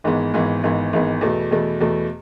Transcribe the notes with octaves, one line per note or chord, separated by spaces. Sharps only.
G#1 G#2 E3 B3
G#1 G#2 E3 B3
G#1 G#2 E3 B3
G#1 G#2 E3 B3
E2 B2 A3
E2 B2 A3
E2 B2 A3